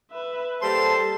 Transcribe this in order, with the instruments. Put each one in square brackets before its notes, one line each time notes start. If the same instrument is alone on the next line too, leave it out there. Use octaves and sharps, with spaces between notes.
[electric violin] B4 E5
[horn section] G3 A#3 C5 [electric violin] A4 [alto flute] A5 [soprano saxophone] C6